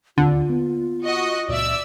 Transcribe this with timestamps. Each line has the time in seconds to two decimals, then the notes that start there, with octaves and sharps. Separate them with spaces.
0.18 D1 D#2 D3 C4 F4
0.50 A#3 B3
1.04 F#4 D#5
1.49 C#2 A#2 D5 E5 E6